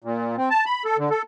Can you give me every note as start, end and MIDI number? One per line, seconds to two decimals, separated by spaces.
0.04 0.36 46
0.37 0.49 60
0.50 0.65 81
0.66 0.84 83
0.85 0.97 69
0.98 1.09 50
1.10 1.22 69